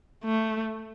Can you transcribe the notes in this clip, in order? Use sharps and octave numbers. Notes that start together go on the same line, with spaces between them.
A3